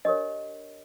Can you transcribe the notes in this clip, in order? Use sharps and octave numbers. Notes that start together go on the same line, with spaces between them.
D4 G4 A#4 C#5 D#5